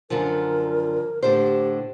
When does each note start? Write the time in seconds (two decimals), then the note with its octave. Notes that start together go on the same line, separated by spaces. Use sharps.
0.10 F#2 D3 F3 A#4
1.23 A2 D3 G4 C5